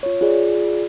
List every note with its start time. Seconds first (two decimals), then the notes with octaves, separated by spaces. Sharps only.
0.03 F4 C#5
0.21 F4 G#4 D5